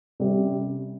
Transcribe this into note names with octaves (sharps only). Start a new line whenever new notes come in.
C3 G3 C#4 G4